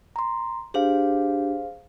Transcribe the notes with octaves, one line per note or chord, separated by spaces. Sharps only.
A#5 C6
D4 G4 G#4 C5 F5